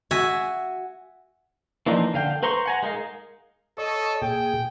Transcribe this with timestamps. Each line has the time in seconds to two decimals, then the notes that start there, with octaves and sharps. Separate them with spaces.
0.11 F#4 E5 G#5
1.86 E3 F3 A#3 D4 D#4
2.14 D3 F5 G5
2.43 B4 C5 A#5 C6 C#6
2.66 F#5 G#5 A#5
2.83 G#3 D#4 A#4 F5
3.78 A4 C#5 D#5
4.22 A#2 G#4 G5